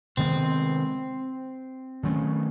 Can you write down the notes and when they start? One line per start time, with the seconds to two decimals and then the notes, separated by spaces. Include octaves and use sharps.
0.17 C3 D#3 G#3 B3 C4
2.03 D#3 F#3 A3 C#4